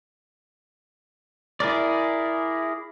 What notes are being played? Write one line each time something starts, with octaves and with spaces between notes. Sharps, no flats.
E4 G#4 A#4 D5